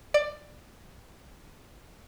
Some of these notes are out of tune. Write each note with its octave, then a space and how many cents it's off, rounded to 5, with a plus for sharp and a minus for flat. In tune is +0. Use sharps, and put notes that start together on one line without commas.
D5 +15